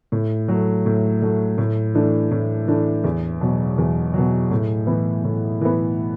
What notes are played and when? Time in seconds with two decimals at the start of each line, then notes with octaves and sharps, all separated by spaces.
0.12 A2
0.48 F#3 A3
0.86 A2
1.22 F#3 A3
1.58 A2
1.95 E3 A3 D4
2.31 A2
2.67 E3 A3 D4
3.04 E2
3.41 B2 F#3
3.78 E2
4.14 B2 F#3
4.51 A2
4.87 E3 B3
5.24 A2
5.61 E3 B3